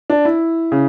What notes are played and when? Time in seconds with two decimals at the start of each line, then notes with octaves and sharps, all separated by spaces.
0.10 D4
0.25 E4
0.72 C#3